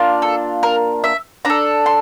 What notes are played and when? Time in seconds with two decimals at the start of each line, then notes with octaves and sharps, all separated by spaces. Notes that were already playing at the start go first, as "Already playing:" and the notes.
Already playing: A#3 D4 F4
0.22 A4
0.63 A#4
1.04 E5
1.45 D4 A4 A#5
1.86 C6